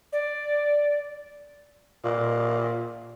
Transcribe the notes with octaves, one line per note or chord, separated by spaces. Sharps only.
D5
A#2